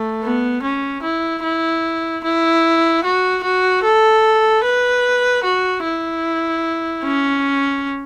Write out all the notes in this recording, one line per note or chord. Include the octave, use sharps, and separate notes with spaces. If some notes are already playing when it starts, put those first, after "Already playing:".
Already playing: A3
B3
C#4
E4
E4
E4
F#4
F#4
A4
B4
F#4
E4
C#4